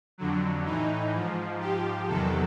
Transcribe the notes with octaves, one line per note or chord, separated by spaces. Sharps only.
F2 D3 F#3
A2 E3 D#4
G#2 F3
G#2 F3 G4
E2 C3 D#3 F#3 A4